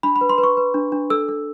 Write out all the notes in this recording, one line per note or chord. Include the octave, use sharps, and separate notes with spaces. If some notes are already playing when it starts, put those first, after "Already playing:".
D4 B5
B5
B4
C6
B4
C#6
B4
D4
D4
A4 E6
A4